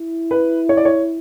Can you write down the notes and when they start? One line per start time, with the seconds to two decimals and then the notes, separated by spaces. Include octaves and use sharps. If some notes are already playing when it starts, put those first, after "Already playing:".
Already playing: E4
0.31 B4
0.69 C#5
0.77 D5
0.85 C#5